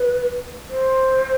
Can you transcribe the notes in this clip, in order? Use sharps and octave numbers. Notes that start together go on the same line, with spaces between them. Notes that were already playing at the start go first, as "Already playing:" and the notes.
Already playing: B4
C5